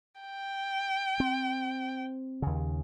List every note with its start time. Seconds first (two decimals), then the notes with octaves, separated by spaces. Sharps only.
0.21 G5
1.20 C4
2.42 D#2 C#3